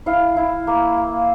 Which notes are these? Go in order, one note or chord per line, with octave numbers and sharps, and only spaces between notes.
E4 F5
E4
A#3
A#3